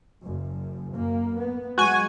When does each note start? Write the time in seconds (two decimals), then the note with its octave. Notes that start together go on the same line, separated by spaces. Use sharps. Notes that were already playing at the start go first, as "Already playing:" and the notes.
0.22 F#1 F#2
0.91 F#2 A#3
1.37 B3
1.78 F#3 G#3 F#4 G#5